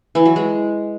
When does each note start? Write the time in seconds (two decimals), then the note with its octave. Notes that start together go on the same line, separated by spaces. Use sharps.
0.15 E3
0.26 F#3
0.36 G#3